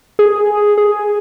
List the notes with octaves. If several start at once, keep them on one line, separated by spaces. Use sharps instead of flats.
G#4
G#4